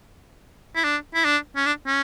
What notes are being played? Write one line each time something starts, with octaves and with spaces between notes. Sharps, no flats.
E4
D4
E4
D4
C#4
D4
C#4